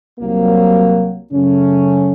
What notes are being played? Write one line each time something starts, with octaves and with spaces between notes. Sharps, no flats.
C2 C3 F#3 A#3
F#2 C#3 F#3 A3 C#4